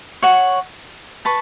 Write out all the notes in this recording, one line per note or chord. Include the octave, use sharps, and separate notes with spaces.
C#5 F#5 C#6
B4 A5 C#6